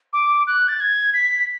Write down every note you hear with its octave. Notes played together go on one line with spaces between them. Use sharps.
D6
F#6
A6
G#6
B6